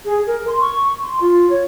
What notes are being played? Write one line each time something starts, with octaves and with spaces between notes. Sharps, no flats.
G#4
A#4
C6
C#6
C6
F4
C#5